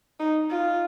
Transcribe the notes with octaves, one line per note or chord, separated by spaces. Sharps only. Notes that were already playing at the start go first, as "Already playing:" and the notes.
D#4
F4